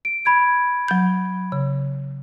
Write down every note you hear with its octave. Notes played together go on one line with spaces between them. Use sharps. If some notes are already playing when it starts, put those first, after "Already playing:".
D7
B5 G#6 D7
F#3 G6
C#3